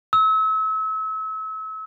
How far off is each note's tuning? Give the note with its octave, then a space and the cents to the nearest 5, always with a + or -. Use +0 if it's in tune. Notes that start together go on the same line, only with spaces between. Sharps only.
E6 -35